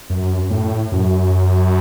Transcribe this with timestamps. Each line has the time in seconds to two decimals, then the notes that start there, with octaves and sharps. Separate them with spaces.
0.10 F#2
0.50 A2
0.92 F#2